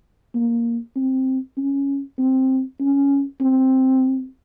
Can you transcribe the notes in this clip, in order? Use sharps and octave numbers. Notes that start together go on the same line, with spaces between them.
A#3
C4
C#4
C4
C#4
C4